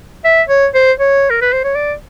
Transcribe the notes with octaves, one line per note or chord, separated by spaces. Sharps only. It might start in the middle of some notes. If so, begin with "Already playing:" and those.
E5
C#5
C5
C#5
A#4
B4
C5
C#5
D5